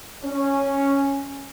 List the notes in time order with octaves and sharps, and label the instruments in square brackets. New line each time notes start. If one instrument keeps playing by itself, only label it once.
[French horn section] C#4